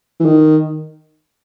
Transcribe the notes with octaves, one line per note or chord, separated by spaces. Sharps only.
E3
D#3